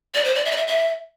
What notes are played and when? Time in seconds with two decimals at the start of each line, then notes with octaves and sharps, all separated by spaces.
0.14 D5
0.25 C5
0.35 D5
0.45 E5
0.51 D5
0.57 E5
0.67 E5